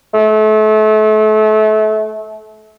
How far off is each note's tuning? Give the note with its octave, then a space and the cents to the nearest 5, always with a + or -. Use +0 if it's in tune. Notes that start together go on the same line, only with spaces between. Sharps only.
A3 -30